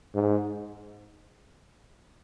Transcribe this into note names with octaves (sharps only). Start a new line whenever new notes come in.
G#2